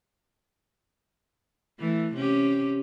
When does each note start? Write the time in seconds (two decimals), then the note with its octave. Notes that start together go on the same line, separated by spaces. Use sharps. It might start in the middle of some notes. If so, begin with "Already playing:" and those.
1.79 E3 A3
2.16 C3 C#4 G4